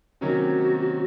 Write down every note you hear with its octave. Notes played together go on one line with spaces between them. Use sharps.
C3 D#3 F#3 A#3 C#4 F#4